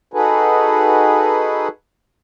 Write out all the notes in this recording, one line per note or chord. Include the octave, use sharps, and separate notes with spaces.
D#4 F#4 G#4 A4 B4